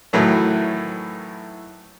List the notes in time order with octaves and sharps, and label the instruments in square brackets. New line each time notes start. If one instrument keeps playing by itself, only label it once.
[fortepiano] A2 D#3 E3 F#3 A3